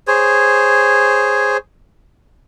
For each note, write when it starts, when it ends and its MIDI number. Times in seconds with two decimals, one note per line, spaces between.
0.07 1.57 68
0.07 1.57 72
0.07 1.57 73